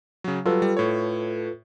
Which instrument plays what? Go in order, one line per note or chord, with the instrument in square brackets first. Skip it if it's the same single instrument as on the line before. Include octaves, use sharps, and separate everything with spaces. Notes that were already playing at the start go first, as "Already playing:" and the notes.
[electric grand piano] C#3 F#3
[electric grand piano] F#3 G3 [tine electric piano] F4 A4 B4
[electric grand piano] G3
A2 C#5